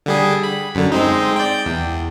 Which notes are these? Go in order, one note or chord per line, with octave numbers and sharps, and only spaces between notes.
D3 G3 G#4
B5
F#2 D3
G#3 C4 D#4
D5 G5
E2